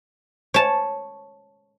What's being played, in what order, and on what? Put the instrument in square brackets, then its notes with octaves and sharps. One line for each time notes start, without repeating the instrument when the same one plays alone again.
[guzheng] C#5 A5